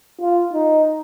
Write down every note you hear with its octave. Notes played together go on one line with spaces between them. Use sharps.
F4
D#4